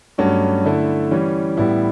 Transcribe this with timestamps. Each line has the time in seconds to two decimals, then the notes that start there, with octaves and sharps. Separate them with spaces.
0.18 G2 F#3 A3 C#4 F#4
0.65 D3 A3 E4
1.11 E3 G3 C#4
1.57 A2 G3 B3 E4